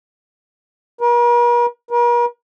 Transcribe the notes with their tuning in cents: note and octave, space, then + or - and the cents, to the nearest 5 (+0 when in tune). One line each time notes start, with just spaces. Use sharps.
A#4 +45
A#4 +45